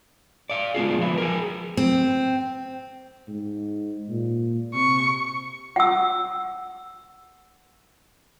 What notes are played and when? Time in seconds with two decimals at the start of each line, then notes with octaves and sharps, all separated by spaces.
0.50 D5 F5
0.75 G#3 B3 D4 F4 G#4
0.99 F3 B4
1.18 G#4 A#4
1.77 C4
3.28 G#2
4.09 A#2
4.74 C3 C#6
5.76 F#5 E6